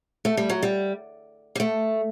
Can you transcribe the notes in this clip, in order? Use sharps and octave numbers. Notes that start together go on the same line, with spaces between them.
A3
G3
F#3
G3
G3
A3